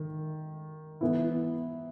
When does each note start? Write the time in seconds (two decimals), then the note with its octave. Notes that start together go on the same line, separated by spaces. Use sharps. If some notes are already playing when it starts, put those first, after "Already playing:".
Already playing: D#3
1.01 E3 B3 E4